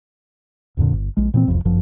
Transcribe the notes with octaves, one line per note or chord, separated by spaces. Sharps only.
D1 F2 A#2 D3
G1
A#1 G#3
A#2 E3 B3 C4
E1 C2 F2
G1 F#2 F3